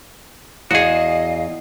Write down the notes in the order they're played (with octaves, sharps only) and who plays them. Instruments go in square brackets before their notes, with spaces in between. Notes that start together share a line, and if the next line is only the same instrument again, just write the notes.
[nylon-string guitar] E2 [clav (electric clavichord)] F#4 G#4 [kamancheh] D#5 [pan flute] F5